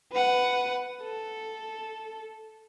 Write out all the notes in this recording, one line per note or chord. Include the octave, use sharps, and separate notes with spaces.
B4 F#5
A4